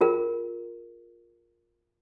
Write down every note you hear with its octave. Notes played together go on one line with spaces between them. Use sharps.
F4 G#4 A#4